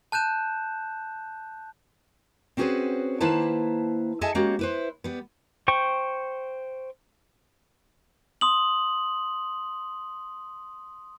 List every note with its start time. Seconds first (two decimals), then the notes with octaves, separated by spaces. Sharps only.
0.12 A5 F#6 G6 E7
2.57 C4 C#4 F#4 G#4 B4 C5
3.20 D#3 A#3 E4 B4 C5 A5
4.21 G#4 A4 D#5 E5 G#5 A5
4.35 G#3 A#3 C#4 F#4 G4
4.59 E4 B4 C5
5.04 G3 B3
5.68 C5 G5 C#6
8.41 C6 D#6 F#7